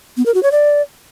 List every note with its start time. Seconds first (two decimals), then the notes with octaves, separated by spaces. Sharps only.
0.17 B3
0.26 A#4
0.34 F#4
0.43 C#5
0.51 D5